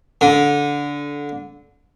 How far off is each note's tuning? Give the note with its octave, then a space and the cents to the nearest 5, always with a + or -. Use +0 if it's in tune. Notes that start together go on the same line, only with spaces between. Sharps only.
D3 -20